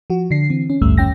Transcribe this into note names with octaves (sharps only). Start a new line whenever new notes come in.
F3 F#4
D3 D4 C7
E3 C4
C#4
A1 D2 G2 G3 A3 E6
D#2 C#4 G5 A#6